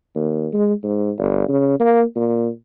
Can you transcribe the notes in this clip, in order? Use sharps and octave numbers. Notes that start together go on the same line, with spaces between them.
D#2
G#3
G#2
G1
C#3
A#3
A#2